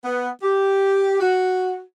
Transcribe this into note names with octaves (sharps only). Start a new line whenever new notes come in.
B3
G4
F#4